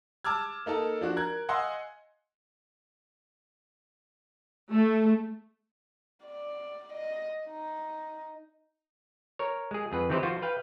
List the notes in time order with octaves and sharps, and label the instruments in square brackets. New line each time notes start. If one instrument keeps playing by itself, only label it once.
[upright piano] A5 D6 E6 F6 G#6
A#3 D#4 A4 A5
F3 D4 F#4
A#4 F#6 G#6
D#5 F5 F#5 G#5 C6 E6
[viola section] A3
[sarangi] D5
D#5
D#4
[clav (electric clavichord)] A#4 C#5
G#3 G#4
F2 G#4 B4 F#5
D#3 E3 C4 G4 B4 C5
F3 F4 F#4 C5
B4 F5 G5